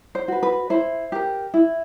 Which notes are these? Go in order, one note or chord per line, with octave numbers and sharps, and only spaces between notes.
C5
F#4 B4
B4
E4 C5
G4 A#4
E4